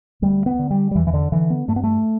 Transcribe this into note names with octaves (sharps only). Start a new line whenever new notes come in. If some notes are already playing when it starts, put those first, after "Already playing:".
D2 G3
B3
D3
G3
G3
E2 E3
E3
D3
D3 E3
B3
G2 A3
B3
A3